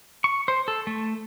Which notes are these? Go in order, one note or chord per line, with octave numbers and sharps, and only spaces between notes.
C#6
C5
A4
A3